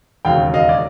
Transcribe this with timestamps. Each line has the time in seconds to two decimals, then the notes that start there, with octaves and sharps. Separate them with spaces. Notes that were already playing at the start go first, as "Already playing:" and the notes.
0.25 E1 D#2 C#3 F#3 F5 G5
0.54 D#5 F5
0.69 D5